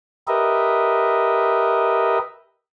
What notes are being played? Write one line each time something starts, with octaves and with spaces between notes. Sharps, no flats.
G4 A#4 B4 D#5 E5